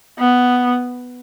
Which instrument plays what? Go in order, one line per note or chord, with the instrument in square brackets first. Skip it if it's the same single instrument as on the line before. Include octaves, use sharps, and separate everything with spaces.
[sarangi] B3